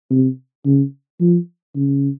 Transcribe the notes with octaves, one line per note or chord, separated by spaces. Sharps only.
C3
C#3
F3
C#3